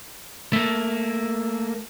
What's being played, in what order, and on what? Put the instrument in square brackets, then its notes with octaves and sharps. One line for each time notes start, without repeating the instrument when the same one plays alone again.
[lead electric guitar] A3 A#3